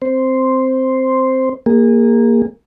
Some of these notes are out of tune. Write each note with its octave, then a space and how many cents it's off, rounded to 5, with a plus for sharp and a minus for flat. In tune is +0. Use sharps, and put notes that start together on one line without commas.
C4 +0 C5 +0
A#3 +0 G#4 -30